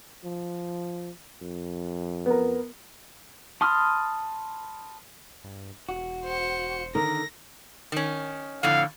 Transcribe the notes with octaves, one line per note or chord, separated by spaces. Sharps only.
F3
F2
B3 A#4
A5 B5 C6 D#6 F6
G2
E1 F#4
C5 C#7
D3 D#3 A#4 A#6
D#3 C#4
F2 A2 D3 F5